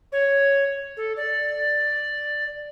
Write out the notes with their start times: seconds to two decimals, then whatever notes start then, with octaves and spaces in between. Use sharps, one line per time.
0.12 C#5
0.97 A4
1.16 D5